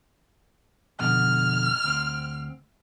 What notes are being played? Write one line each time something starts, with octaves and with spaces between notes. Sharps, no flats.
F2 B2 D3 F6
D2 C4